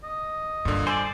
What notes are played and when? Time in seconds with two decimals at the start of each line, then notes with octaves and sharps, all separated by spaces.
0.04 D#5
0.65 G2 A#2 D3
0.87 C5 D5 G#5 D6 E6